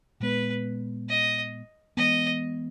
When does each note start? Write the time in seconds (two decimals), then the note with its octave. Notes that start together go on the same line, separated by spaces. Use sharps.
0.20 A#2 G#3 B3 B4
1.09 D#5
1.97 E3 G#3 B3 D#5